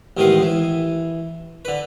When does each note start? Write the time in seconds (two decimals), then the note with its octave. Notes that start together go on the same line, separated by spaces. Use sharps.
0.17 A1 D#3 G#3 B3 C6
0.43 E3
1.65 D3 B4